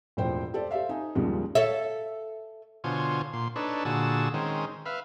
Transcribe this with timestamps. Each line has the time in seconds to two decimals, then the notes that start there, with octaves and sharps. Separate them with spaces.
0.17 E1 A2 F3 C5 G5
0.54 G4 A4 C5 D5
0.71 G4 A4 C5 E5 F5
0.89 D#4 G#5
1.15 A1 D#2 C#3 F3 G3 G#3
1.55 A4 C#5 E5
2.84 B2 D3 F4 C5 C#5 G#5
3.33 A#2 C6
3.56 D4 D#4 A4 B4 C#5
3.85 A#2 D3 F#4 G#4 A5 E6
4.34 D#3 G#3 C4 C#4
4.86 B4 E5 F5